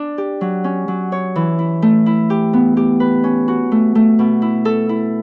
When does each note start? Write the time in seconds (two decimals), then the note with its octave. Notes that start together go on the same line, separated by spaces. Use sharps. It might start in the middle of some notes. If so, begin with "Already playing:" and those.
Already playing: D4
0.18 G4
0.41 F#3
0.64 C#4
0.88 F#3
1.12 C#5
1.36 E3
1.59 E4
1.82 A3
2.06 E4
2.30 G4
2.53 B3
2.77 G4
3.00 B4
3.24 C#4
3.48 F#4
3.72 A3
3.95 A3
4.19 B2
4.42 E4
4.65 A4
4.89 E4